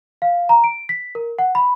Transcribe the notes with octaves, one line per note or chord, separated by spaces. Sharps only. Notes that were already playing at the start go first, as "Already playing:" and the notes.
F5
A#5
D7
B6
A#4
F#5
B5